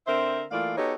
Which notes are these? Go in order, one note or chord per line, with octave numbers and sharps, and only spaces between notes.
D3 C4 A#4 C5 E5
E3 A3 A#3 F4 D5 F5
B3 D#4 F#4 G4 A4 C#5